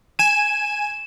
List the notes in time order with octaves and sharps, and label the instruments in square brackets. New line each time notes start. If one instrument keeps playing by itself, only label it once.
[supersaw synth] G#5 D#7 [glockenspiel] E7